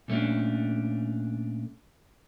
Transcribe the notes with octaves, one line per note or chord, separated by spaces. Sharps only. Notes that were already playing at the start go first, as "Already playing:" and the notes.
A#2 A3 C#4 D4